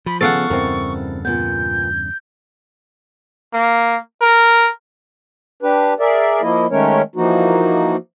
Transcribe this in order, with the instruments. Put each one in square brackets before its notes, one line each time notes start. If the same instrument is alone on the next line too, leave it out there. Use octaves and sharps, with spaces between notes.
[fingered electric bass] F3 [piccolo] B5
[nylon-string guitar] C#3 B3 [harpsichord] A4 F5 F#5 [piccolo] C#6
[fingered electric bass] E2 G2 C#3 [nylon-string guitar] C4 E4 A#4
[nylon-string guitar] A#2 B3 [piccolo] G6
[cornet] A#3
A#4
[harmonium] D4 G4 B4
G#4 A#4 D5 E5
F3 A#3 E4 D#5
D#3 G#3 A3 C#4 A#4 C#5
E3 F3 A#3 D#4 F#4